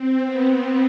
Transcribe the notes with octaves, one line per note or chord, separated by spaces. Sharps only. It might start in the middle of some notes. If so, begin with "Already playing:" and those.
Already playing: C4
B3
B3